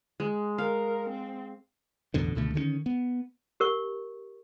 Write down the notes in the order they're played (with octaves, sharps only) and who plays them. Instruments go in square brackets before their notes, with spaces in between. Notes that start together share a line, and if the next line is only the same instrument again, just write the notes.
[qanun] G#3
[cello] A#4 [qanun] F5
[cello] C4
[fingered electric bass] A1 E2 B2 D3
C#2 B2 D3 A3
D3 D#3 G3 C#4
B3
[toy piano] G4 A#4 C#6